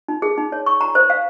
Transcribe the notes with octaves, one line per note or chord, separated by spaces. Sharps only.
D#4
G#4
D#4
C#5
C#6
A#5
C5
F5